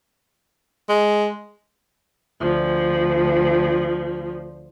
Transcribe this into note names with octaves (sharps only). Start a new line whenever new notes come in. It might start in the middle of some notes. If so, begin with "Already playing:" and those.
G#3
D2 F3